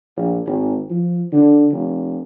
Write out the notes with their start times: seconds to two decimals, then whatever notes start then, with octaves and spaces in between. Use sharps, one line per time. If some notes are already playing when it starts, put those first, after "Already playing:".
0.16 A#1
0.46 G#1
0.90 F3
1.32 D3
1.72 F1